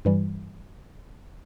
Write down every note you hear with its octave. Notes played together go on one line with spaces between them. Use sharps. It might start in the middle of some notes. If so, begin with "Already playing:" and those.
G2 E3 G3